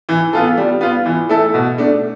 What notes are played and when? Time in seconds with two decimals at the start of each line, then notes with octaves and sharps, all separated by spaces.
0.09 E3
0.33 B3 F4 A4
0.58 G3
0.81 B3 F4
1.05 E3
1.29 A3 E4 A4
1.54 B2
1.78 A3 D4